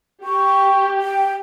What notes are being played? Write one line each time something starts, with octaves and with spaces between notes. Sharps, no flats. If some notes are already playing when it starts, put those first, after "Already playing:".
G4 C#6
G5